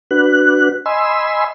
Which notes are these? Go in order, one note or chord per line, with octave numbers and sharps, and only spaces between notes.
D4 F#4 B4 F#6
D#5 G#5 B5 C6 E6